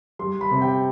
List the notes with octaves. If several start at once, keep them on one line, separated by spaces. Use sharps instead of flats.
G3 C6
B5
C3
G5